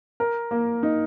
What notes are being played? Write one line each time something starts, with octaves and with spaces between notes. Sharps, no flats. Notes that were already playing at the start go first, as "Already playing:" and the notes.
A#4
A#3
D#4